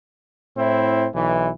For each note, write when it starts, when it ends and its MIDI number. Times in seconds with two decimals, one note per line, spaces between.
0.56 1.06 45
0.56 1.06 60
0.56 1.06 64
1.14 1.49 35
1.14 1.49 52